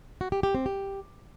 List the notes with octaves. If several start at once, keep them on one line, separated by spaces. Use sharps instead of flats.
F#4
G4
G4
C4
G4